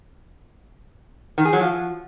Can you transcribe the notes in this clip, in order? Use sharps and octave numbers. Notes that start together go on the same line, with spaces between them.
D#3
G#4
F#3
F3